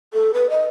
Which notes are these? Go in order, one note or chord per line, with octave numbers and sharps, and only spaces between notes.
A4
B4
D#5